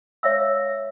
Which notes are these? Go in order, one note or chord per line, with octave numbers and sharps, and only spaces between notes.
C#5 E5 F5 E6